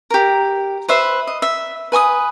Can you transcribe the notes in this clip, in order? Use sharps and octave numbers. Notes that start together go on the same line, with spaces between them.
G4 A#4
B4 C5 E5
D#5
E5
B4 G#5 C6 D#6